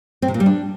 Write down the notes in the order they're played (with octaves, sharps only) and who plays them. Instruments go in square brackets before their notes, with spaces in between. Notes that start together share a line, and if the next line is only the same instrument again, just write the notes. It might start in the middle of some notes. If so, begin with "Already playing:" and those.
[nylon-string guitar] C4
C3
A#2
G3
D4